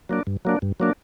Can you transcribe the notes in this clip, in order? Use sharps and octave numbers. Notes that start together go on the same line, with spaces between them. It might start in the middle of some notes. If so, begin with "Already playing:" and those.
F#3 A#3 D4
G2
F#3 A#3 D4
G2
F#3 A#3 D4